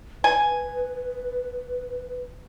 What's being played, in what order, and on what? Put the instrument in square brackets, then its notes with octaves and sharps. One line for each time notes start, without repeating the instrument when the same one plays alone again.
[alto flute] B4 [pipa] G#5